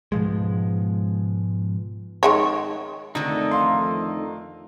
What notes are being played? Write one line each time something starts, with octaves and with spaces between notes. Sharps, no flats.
G#2 B2 F3 G#3
D#3 G#3 C#5
F2 D3 D#3 A3 D#4
F5 C6